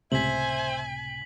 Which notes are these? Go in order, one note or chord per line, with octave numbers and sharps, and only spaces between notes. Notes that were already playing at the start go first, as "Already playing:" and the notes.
C#2 A2 C3 C5 E5 G#5 B6 F#7